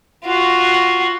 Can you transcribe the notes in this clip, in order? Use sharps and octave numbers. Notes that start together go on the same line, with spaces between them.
F4 F#4